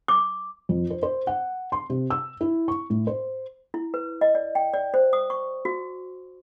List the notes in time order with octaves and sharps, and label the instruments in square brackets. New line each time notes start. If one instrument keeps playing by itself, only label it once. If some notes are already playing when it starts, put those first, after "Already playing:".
[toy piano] D6
[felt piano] F2
C5
C5
F#5
C6
C3
E6
E4
C#6
A2
C5
[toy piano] E4
B4
D#5
D5
G5
D5
C5
D#6
C#6
F#4